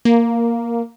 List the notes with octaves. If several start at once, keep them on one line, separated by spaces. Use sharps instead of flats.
A#3